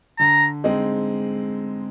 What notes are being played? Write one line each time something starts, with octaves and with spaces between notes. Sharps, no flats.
D3 A#5
G#3 C4 D#4